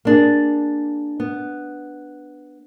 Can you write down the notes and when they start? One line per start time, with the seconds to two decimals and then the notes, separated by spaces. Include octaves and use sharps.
0.05 A#3 D4 G#4
1.20 B3